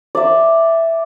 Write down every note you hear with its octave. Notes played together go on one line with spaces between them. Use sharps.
D5 E5